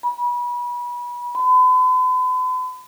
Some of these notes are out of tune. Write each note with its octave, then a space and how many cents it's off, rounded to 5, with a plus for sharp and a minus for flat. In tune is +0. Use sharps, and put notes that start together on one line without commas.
B5 -30
B5 +45